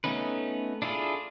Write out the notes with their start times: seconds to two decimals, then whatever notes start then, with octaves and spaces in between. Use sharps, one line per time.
0.04 A3 B3 C#4 D#4 B4
0.82 D4 E4 F4 G#4 A4